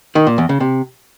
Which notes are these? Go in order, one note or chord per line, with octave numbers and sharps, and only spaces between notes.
D#3
A#2
E2
C#3
C3